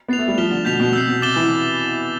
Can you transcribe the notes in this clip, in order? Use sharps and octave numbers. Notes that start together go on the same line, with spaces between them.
B3 A6 C7 F7
A3
G3
F3 F6 B6 E7 G7
D3
B2 G6 B6 F7
B2
C3 E6 G6 C7
B2
C3 D6 A6 E7 G7
E3